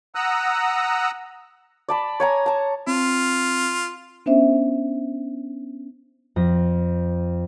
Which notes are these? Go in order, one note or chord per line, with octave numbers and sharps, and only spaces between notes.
F#5 A#5 D#6 E6 F#6
D5 A5 B5
C#5 G#5 A#5
A5 A#5
C4 F4
B3 C#4 D4 C5 E5
F2 A#6